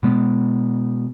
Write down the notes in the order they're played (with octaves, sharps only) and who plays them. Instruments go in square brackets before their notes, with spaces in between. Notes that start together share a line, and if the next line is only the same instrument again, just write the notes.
[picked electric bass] B2 G#3 B3